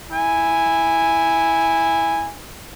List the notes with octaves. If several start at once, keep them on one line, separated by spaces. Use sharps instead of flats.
E4 G#5